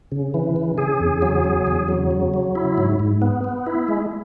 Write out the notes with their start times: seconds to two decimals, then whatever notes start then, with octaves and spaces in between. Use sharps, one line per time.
0.12 C#3
0.34 E3
0.56 C#3
0.78 C#3 G#4
1.00 E2
1.22 F#3
1.44 C#3
1.67 E2
1.88 F#3
2.11 C#3
2.34 F#3
2.55 E4
2.78 G#2
3.00 G#2
3.22 B3
3.44 B3
3.67 E4
3.88 G#3